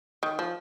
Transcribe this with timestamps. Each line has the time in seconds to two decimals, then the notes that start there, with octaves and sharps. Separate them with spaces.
0.23 D#3
0.39 F3